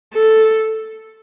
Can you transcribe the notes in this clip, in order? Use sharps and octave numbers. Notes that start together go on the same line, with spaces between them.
A4